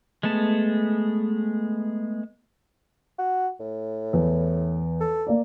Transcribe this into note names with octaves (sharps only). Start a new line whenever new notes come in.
G#3 A3 B3 A5
F#4
A2
E2
A4
A#3 D5